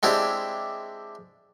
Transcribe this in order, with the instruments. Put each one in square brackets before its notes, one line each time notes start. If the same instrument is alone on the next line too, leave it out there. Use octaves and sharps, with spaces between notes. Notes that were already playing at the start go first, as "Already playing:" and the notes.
[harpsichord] G#3 C4 D4 E4 G4